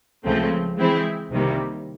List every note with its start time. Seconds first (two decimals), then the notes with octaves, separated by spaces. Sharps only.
0.25 C#2 C#3 F3 A3 C4
0.77 E3 G#3 C4 E4
1.30 C2 C3 D#3 G3 A#3